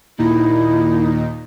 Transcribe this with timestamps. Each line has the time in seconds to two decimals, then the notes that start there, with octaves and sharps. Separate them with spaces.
0.18 D#2 A#2 D#4 E4